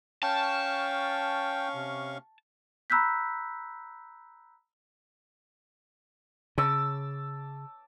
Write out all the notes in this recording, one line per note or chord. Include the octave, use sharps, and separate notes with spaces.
C#4 F5 G5 A5 C#6
C3
A#5 B5 E6 F#6 G6 B6
C#3 A5 D6 E6